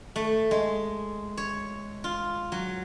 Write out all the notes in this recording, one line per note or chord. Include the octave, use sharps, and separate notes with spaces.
A3
G#3
C#5
F4
F#3